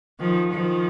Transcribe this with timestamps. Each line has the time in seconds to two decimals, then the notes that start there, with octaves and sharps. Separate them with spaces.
0.20 D#3 F3
0.52 D#3 F3